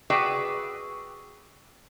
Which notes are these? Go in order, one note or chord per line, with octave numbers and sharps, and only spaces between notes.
F#4 G#4 B4 D5 E5 G5